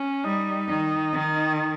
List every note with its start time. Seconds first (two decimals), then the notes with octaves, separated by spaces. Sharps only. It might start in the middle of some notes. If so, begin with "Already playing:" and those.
Already playing: C#4
0.25 G3 D#4
0.69 D#3
1.13 D#3